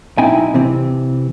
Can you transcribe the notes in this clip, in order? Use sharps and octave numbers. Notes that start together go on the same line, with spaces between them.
B1 C4 D#4 E4 G5 G#5
C3 E3 C4